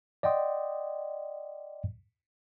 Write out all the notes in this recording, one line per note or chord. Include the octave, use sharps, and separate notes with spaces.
D5 D#5 F#5 G5 C6 D#6